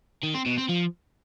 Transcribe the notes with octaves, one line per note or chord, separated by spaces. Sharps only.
D#3
C4
B2
C4
F3